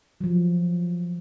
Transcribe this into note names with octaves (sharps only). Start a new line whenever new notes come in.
F3 F#3